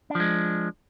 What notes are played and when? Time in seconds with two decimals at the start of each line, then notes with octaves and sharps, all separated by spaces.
0.10 D4
0.15 F3
0.20 G#3